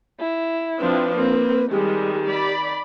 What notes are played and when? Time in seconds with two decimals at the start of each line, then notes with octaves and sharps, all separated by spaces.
0.20 E4
0.80 F3 C4 D4 B4
1.18 A#3 C4
1.71 D#3 G3 G#3 G4
2.27 D5 B5